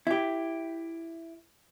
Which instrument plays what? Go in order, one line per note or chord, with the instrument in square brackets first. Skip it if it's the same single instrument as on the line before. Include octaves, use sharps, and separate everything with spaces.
[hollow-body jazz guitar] E4 G4